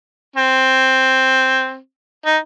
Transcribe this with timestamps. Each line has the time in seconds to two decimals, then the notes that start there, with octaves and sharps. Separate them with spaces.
0.36 C4
2.26 D#4